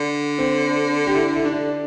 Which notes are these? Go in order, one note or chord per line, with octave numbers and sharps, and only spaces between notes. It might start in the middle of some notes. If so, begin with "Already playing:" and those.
Already playing: D3
C4
G4
E4
E4
D4